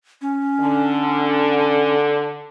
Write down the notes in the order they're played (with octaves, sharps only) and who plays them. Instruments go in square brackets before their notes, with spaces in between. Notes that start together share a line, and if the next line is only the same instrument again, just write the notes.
[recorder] C#4
[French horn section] D3